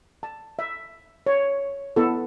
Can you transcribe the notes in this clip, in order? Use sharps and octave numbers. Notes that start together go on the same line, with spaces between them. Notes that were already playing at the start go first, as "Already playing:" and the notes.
A5
E5
C#5
B3 E4 A4